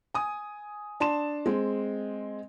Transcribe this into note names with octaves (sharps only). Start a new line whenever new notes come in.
G#5 D#6
D4 A5 C6 E7
G#3 C4